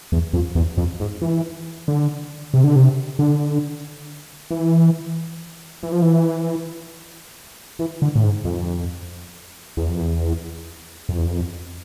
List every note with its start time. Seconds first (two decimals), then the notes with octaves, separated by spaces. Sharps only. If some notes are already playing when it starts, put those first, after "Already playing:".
0.12 E2
0.33 F2
0.55 E2
0.77 F2
1.00 G#2
1.22 E3
1.88 D3
2.54 C3
2.64 D3
2.76 C3
3.19 D3
4.51 E3
5.83 E3
5.92 F3
6.02 E3
7.79 E3
8.02 D3
8.15 A2
8.23 G#2
8.45 F2
9.77 E2
9.89 F2
10.00 E2
11.09 F2
11.18 E2
11.26 F2